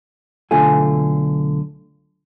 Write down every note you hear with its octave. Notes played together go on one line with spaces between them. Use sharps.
B1 D3 A3 F4 A4 G#5